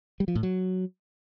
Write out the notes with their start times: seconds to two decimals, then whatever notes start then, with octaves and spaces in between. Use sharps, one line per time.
0.20 G3
0.28 F3
0.35 A2
0.43 F#3